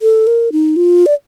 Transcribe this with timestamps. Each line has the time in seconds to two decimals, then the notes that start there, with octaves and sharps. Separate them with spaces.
0.02 A4
0.27 A#4
0.52 D#4
0.76 F4
1.06 D5